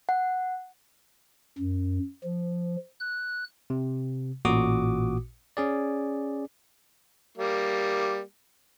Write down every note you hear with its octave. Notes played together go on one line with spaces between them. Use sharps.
F#5
F#2
F3
F#6
C3
A1 A#2 F#4 D6 D#6
C#4 G#4 D5
G3 A#3